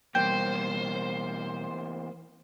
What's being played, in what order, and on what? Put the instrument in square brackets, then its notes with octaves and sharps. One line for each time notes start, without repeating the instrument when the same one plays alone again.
[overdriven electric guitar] E2 A#3 [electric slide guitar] B2 G3 F5 [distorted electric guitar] C5 [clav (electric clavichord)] G5